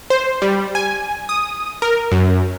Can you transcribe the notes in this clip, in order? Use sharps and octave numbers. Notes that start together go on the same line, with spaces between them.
C5
G3
G#5
D#6
A#4
F#2